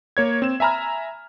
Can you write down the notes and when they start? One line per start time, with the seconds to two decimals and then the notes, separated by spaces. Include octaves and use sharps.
0.17 A#3 C#5 G#6
0.42 C4 E7
0.60 E5 G#5 A#5 B5 F6